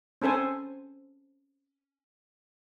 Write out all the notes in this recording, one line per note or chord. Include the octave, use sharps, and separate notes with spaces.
C4 C#4 A4 C5 G#5